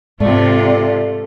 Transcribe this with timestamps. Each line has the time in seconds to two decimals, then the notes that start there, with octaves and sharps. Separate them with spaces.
0.20 G#2 C3 A3 F4 D5